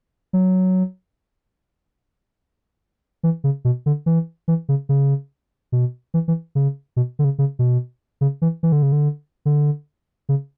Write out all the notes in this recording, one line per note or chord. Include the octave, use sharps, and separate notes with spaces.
F#3
E3
C#3
B2
D3
E3
E3
C#3
C#3
B2
E3
E3
C#3
B2
D3
C#3
C#3
B2
C#3
E3
E3
D3
C#3
D3
D3
C#3